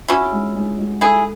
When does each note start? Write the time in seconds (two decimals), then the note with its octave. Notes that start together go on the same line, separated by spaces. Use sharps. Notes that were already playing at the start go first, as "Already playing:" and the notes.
0.08 C#4 E4 F#4
0.32 G#3
0.56 G#3
0.78 G#3
1.01 E4 G#4 A4